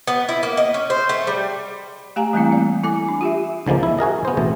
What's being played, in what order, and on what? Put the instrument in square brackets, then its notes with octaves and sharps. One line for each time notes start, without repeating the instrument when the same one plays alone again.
[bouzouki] B3
E4
A#3
D#5
C#4
C5
A3
G3
[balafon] A3 G4 F5 G#5 A#5
E3 G3 A3 A#3 C4 E4
D5
E4 A4 G#5 D6
D4
F4 G4 E5
[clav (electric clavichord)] C#2 D3 F3 G#3 A#3
E4
F#4 G#4 A#4 D#5
B3 C5
A1 B2 A3